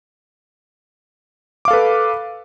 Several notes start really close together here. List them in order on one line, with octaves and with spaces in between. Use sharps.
D6 F5 A4 B4